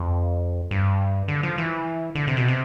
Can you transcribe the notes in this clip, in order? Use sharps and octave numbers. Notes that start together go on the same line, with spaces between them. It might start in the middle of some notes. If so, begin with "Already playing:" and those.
Already playing: F2
G2
D3
F3
E3
D3
C3
B2
C3